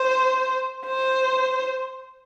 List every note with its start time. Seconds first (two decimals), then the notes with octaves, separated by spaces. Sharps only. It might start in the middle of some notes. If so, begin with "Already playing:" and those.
Already playing: C5
0.86 C5